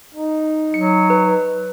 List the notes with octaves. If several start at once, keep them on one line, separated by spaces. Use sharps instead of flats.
D#4
F#3 C#7
B4